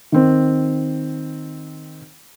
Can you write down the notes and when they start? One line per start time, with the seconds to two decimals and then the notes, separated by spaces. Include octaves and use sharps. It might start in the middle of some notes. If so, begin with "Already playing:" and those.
0.12 D#3 C4